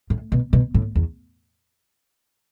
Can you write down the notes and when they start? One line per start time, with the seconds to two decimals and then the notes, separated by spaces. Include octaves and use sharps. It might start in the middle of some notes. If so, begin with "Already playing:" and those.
0.10 A2
0.32 B2
0.53 B2
0.74 A2
0.95 E2